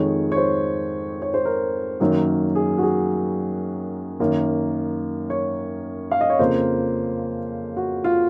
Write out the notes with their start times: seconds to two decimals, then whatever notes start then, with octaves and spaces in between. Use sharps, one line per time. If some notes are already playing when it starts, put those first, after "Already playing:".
Already playing: F2 D#3 G#3 C#5
0.32 C#5
0.36 C5
1.22 C#5
1.34 C5
1.45 A#4
2.00 F#2 D#3 F#3 A#3
2.55 G#4
2.78 F#4
2.83 G#4
4.20 F#2 D#3 A#3
5.30 C#5
6.11 F5
6.21 D#5
6.30 C#5
6.39 F2 C#3 F3 A#3 C5
7.77 F#4
8.04 F4